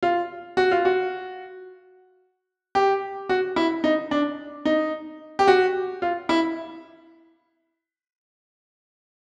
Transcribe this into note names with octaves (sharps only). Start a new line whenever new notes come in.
F4
F#4
F4
F#4
G4
F#4
E4
D#4
D4
D#4
G4
F#4
F4
E4